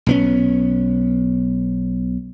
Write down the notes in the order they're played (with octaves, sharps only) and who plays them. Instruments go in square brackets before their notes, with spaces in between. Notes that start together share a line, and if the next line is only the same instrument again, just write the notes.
[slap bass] B1 B3 C#4